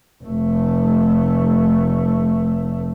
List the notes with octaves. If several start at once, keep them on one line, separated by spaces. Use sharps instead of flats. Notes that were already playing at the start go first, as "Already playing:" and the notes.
F1 A3